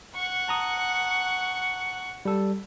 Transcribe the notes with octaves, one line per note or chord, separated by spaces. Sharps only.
F#5 C#6
A5 A#5 D#6
G3 A4